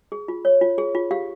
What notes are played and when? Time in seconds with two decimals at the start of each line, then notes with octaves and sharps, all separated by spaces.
0.12 G#4
0.28 F4
0.45 C#5
0.61 F4
0.78 G#4
0.95 F4
1.11 G4 F5